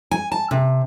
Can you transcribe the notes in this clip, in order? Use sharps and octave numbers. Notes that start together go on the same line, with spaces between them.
G#5
A5
C3